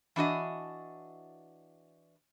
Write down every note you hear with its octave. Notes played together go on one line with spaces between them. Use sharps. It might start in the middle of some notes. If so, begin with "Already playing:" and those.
E3 D4 F#4 D#5